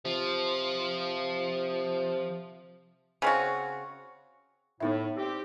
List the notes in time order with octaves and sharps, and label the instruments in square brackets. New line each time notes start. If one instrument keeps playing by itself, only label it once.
[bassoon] C3 [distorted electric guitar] F3
[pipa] C#3 C4 F#4
[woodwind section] A2 [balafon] B3 D#4 E5
[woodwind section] G3 C4 G4